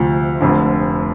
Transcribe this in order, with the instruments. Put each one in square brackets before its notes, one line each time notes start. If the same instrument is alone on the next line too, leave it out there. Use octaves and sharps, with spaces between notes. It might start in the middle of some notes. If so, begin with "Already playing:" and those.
Already playing: [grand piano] D2 C3 F3
F1 F2 D3